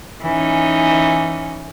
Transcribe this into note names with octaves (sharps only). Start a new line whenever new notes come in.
E3 C#4 D#4